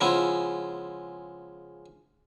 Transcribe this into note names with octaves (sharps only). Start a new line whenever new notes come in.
C#3 F3 G#3 B3 E4